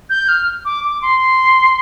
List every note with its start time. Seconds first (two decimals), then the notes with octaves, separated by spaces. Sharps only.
0.10 G6
0.29 F6
0.65 D6
0.84 D6
1.02 C6